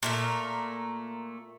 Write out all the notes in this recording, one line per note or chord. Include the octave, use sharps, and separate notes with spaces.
A#2 A3 A#4